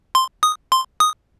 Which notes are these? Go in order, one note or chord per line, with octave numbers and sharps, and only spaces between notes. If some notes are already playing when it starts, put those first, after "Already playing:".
C6
D#6
C6
D#6